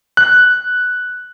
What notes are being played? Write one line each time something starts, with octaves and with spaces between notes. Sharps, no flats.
F#6